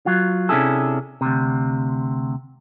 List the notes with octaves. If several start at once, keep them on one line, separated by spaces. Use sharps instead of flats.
F#3 F4
C3 C#4 D4 E4 G#4 A4
D2 C3